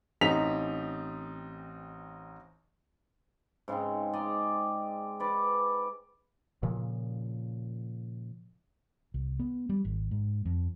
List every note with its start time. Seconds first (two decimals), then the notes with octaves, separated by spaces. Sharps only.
0.21 A1 C4 D#4 B6 F7
3.68 G#2 C#3 G#3 C4
4.13 D5 D#5 A#5
5.20 B4 D5
6.63 A#2 C#3 F3
9.14 C2
9.39 B3
9.69 G3
9.85 G#1
10.11 G#2
10.45 F2